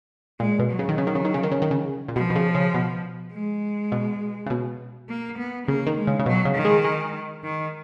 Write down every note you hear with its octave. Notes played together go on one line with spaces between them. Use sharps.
A#2 G#3
B2
F#3
C#3
D#3
C#3
D#3
C#3
D#3
C#3
D#3
C#3
D#3
C#3
A#2
B2 F3
B2
C#3
C#3
B2
G#3
B2
C#3
B2
A#3
B3
C#3 A#3
D#3
G#3
C#3
C#3
B2 F#3
C#3
D#3
G#3
G#3
D#3